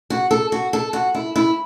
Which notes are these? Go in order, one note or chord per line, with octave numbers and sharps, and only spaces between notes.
F#4
A4
F#4
A4
F#4
E4
E4